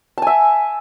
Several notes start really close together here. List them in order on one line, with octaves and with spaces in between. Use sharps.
A5 G#5 E5